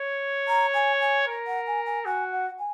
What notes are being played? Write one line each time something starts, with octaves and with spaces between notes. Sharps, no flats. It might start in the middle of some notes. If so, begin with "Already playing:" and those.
Already playing: C#5
A#5
G#5
G#5
A#4
F#5
G#5
G#5
F#4 G#5
F#5
G#5